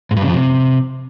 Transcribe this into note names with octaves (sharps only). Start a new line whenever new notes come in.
G#2
G2
C#3
F2
C3